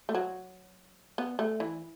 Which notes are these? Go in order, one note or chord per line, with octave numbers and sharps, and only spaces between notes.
A3
F#3
B3
A3
E3